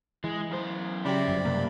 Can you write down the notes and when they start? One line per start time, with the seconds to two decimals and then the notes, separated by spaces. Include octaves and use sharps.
0.24 E3 G#3
0.51 F#2 C5
1.05 C#3 F#3 G4 C5 D5 E5 B5
1.28 G1 F#2
1.45 G2 C3 A#3